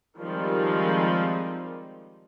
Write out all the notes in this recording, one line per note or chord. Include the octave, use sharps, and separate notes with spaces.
D#3 F3 G3 G#3 C4 D#4